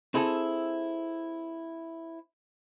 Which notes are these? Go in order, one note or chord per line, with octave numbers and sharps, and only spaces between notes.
C4 E4 G#4 A4